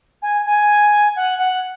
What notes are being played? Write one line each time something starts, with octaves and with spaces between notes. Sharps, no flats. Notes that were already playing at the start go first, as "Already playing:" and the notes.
G#5
G#5
F#5
F#5